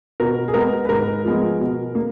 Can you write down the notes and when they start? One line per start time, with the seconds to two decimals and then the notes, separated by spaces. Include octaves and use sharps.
0.20 B2 A#4
0.48 G#4
0.54 G#3 B3 A#4
0.85 B4
0.89 G#2 A#4
1.25 F3 G#3 B3
1.60 B2
1.95 A#3